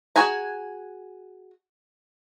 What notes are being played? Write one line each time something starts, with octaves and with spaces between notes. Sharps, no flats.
F#4 G#4 G#5 A#5